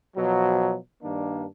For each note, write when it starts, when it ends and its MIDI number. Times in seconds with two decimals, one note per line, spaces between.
0.17 0.76 47
0.17 0.76 53
0.17 0.76 54
1.03 1.45 43
1.03 1.45 51
1.03 1.45 58
1.03 1.45 62